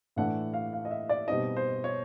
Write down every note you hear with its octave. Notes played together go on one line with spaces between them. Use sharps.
A2 E3 A3 D4 F#5
F5
F5
D#5
E5
D5
B2 G3 C4 D#4 D#5
C5
C#5